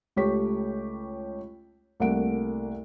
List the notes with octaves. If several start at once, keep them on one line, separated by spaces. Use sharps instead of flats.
C#2 A3 G4 C#5 C#6 B6
C2 A3 A#3 F#5 D7